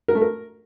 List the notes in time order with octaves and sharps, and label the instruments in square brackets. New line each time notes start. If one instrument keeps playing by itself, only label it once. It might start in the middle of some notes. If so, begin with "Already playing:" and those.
[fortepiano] A#4
A3
A#4